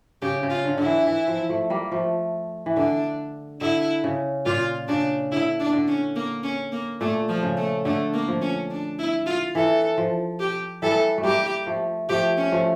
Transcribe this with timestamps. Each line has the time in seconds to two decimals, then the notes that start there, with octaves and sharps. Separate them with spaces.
0.22 C#3 G4
0.43 C#3
0.50 F4
0.65 D3
0.78 D3 E4
0.86 E3
1.07 E3
1.28 F3
1.49 F3 A3
1.70 G3 A#3
1.91 F3 A3
2.66 E3
2.77 D3 D4
3.61 D3 E4
4.04 C#3
4.46 A#2 F4
4.88 C#3 D4
5.32 D3 E4
5.60 D4
5.73 D3
5.88 C#4
6.16 A#3
6.43 C#4
6.72 A#3
7.01 A#2 A3
7.29 F3
7.43 C#3
7.57 A3
7.85 D3 A3
8.14 A#3
8.28 F3
8.41 C#4
8.70 D4
8.99 E4
9.26 F4
9.55 E3 A4
9.98 F3
10.40 G4
10.82 E3 G3 A4
11.18 A3
11.24 G3 A#3 G4
11.67 F3 A3
12.09 F3 A3 G4
12.37 C#4
12.52 F3 A3